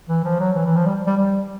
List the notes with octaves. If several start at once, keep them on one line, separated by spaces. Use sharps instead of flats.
E3
F3
F#3
E3
E3
F3
G3
G3
G3